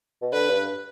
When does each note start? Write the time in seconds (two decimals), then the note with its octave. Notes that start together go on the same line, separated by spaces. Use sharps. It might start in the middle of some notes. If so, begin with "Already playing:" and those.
0.22 B2
0.32 D3 B4
0.50 G2